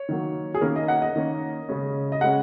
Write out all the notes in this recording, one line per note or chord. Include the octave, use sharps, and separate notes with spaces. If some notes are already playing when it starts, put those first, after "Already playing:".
Already playing: C#5
D#3 F#3 A#3
G#4
D#3 A#3 C#4 A#4
D#5
F#5
D#5
D#3 A#3 C#4
C#3 G#3 C#4
D#5
C#3 G#3 C#4 F#5